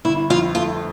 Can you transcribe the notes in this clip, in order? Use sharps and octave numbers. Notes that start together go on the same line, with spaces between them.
G1 E4
F2 F4
A3 F4